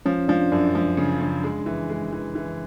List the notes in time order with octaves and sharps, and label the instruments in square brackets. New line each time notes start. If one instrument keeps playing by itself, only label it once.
[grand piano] F3 [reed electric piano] C#4
[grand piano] F3 [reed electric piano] D4
[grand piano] F#2 [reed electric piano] D4
[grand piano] F3
C#3
C#3
G#3
E3
G#3
E3
E3